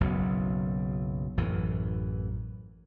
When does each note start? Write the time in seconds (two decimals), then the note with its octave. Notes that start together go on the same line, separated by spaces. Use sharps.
0.01 F#1 B1 F#2
1.38 A1 F#2 E3